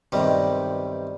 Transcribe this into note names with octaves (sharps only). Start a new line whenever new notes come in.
B1 G2 C3 D#3 G3